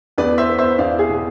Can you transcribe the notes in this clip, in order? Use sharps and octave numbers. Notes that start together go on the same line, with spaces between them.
E2 B4 D5
C5 E5
B3
C5 E5
E2 D5 F5
G#4
B2